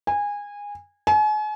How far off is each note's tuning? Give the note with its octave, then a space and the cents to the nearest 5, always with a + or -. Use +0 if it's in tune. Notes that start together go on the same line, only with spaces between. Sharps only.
G#5 -20
G#5 +40